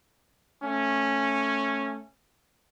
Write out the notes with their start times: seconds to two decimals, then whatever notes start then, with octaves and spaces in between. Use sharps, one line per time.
0.62 A3 C#4